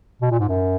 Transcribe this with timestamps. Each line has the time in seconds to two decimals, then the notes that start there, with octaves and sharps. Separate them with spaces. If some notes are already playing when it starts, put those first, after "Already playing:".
0.22 B2
0.31 A#2
0.40 G#2
0.49 F#2